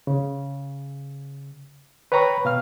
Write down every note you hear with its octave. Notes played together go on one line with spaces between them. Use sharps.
C#3
B4 C#5 G5 A#5 B5 C#6
B2 F5 F6